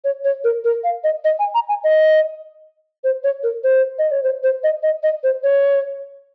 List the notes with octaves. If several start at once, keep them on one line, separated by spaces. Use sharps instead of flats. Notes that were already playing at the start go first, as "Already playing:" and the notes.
C#5
C#5
A#4
A#4
F5
D#5
D#5
G#5
A#5
G#5
D#5
C5
C#5
A#4
C5
D#5
C#5
C5
C5
D#5
D#5
D#5
C5
C#5